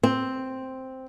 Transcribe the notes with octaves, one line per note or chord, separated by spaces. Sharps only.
C4